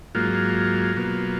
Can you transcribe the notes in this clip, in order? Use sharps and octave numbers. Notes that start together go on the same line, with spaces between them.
G#2 F#3 A#3 F4
B2 F#3 A#3